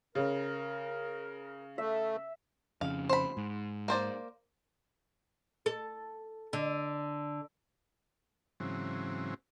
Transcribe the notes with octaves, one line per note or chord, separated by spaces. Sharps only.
C#3 A#4
A3 E5
F2 C#3 F5
C5 B5
G#2
A#3 C5 D5
A4
D3
G#2 C#3 E3 F#3 C4